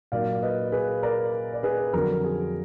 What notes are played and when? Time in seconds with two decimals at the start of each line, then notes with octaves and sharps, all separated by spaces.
0.12 A#2 F#3 A#3 D#4 D5 F5
0.42 B4 D#5
0.72 G#4 B4
1.03 A#4 D5
1.54 D5
1.63 G#4 B4
1.93 F2 D3 F#3 D4 A#4
2.24 G#4